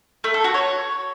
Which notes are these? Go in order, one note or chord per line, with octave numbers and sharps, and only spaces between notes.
A3
A4
F#4
C#5